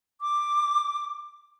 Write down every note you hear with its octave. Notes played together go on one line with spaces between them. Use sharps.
D6